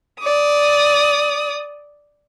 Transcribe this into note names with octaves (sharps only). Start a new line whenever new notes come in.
D5 D#6